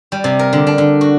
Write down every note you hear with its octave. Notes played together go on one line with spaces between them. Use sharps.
G3
C3
A#4
D3
D4
D3
F#4